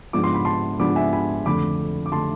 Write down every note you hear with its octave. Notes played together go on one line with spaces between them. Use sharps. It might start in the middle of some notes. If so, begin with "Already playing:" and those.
G#2 F3 B3 D4 D6
C6
B5
A5 C6
G#2 F3 B3 D4 B5 D6
E5 G#5
G#5 B5
F2 D3 A3 B5 D6
D6
D3 A3 A5 C6